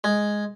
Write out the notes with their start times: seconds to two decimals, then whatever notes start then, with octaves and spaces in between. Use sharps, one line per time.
0.04 G#3